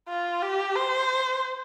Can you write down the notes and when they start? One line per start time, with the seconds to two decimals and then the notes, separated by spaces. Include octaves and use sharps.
0.09 F4
0.42 G4
0.75 C5